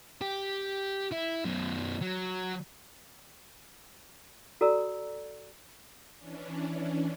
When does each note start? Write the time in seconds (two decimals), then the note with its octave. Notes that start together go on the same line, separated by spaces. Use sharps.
0.21 G4
1.12 E4
1.45 F#2 B2
2.01 F#3
4.61 F#4 A4 D5 A#5 E6
6.19 E3 C#4 D4